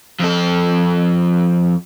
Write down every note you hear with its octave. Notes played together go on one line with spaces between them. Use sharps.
F2 A4